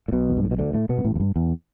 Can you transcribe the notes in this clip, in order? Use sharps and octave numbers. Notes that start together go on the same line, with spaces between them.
A2
B1 B2
E2
G2
A2
B2
D2 D3
A2 A3
B2 B3
G2
A1 A2
E2
G2
E2